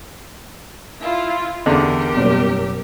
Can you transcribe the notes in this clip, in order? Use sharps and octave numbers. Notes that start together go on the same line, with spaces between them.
E4 F4
E2 D3 G4 A#4
F#1 B2 G3